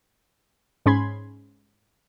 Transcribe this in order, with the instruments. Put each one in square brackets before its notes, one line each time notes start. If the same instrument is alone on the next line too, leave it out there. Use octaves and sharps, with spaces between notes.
[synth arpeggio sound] G#2 C#4 G#4 B5 C6 G#6